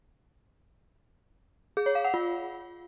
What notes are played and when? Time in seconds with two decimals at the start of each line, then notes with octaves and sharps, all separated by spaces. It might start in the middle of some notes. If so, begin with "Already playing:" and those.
1.77 G#4
1.86 C#5
1.95 F5
2.05 F#5
2.14 F4